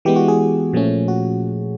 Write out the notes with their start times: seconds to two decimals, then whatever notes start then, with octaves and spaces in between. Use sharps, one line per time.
0.05 E3 G#3 B3 G4
0.16 F#4
0.28 G#4
0.73 A#2 F3 A3 C#4
1.08 F#4